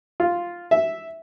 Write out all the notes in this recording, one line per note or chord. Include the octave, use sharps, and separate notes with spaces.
F4
E5